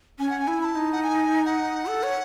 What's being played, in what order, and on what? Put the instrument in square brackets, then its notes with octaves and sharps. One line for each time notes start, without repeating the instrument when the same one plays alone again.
[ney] C#4 [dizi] G#5
[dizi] F#5
G#5
[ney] E4
[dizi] B5
A5
[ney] D#4
[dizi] F#5
G#5
F#5
[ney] A4
C#5